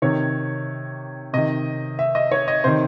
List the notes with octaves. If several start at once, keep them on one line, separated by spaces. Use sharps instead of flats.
C3 D#3 C#5
C3 D#3 D#5
E5
D#5
C#5
D#5
C3 D#3 C5